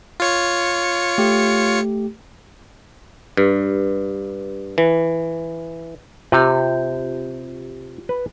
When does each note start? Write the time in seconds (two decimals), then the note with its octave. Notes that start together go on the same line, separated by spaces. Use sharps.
0.20 F4 C#5 C#7
1.18 A3 G4
3.37 G2
4.78 E3
6.32 C3 F4 G4 G6
8.09 B4